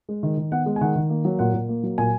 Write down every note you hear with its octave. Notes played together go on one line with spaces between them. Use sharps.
G#3
D#3
D#3
B3 F#5
G#3
G#5
D#3 F#5
D#3
A#3
F#3
A#2 F#5
A#2
A#3
F#3
A#2 G#5